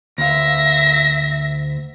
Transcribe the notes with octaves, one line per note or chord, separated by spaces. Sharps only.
D2 E5 F5 A#6